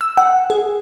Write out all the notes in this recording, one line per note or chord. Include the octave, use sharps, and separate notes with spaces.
E6
F#5
G#4